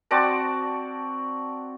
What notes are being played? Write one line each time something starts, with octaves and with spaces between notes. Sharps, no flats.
C4 F#4 D5 A5